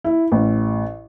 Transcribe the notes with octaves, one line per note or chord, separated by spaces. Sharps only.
E4
A1